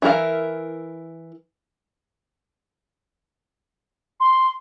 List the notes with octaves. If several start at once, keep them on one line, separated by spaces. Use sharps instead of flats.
E3 E4 G#4 A#4 F5
C6